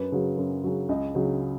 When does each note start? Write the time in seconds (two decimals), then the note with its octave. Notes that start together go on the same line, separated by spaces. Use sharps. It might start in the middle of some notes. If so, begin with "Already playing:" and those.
Already playing: F#2 B4
0.12 C#3 F#3
0.37 F#2
0.64 C#3 F#3
0.89 C#2 D#5
1.15 C#3 F#3